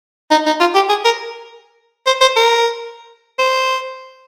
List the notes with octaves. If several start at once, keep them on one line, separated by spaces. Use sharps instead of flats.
D#4
D#4
F4
G4
G#4
A#4
C5
C5
A#4
C5